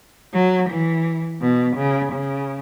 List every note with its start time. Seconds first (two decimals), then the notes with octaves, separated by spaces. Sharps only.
0.34 F#3
0.70 E3
1.42 B2
1.77 C#3
2.13 C#3